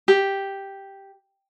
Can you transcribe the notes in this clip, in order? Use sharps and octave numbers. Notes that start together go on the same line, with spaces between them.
G4